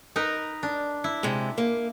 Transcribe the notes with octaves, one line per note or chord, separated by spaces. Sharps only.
D#4 A#4 B4
D4
E4
C3 G#3
A#3